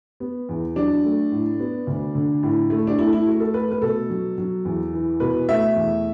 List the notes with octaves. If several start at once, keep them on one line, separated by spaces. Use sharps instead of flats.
B3
E2
F#3 D4
A3
A2
B3
D2
D3
A2
A3
D4
A3 E4
E4
A3 F#4
A4
A3 B4
B4
B2 A4
F#3
F#3
E2
E3
B2 B4
A3 E5
E2